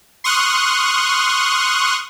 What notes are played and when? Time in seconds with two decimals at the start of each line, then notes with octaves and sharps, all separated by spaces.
0.24 C6 C#6 D#6 F6 F#6